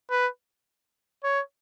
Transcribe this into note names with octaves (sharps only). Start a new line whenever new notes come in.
B4
C#5